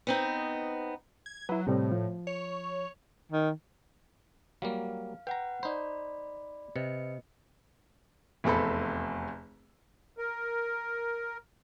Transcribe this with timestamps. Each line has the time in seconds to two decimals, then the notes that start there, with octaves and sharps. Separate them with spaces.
0.07 B3 C4 D#4
1.26 G#6
1.49 F#3 E4 B4
1.67 A2 C3 G3 C4
1.91 F3
2.27 C#5
3.32 D#3
4.62 F#3 G3 A#3 F5
5.27 B4 F#5 G5 A#5
5.63 D#4 C5 D5 B5
6.76 C3 B4 D#5 C#7
8.44 F1 E2 C4 A4 B5
10.18 A#4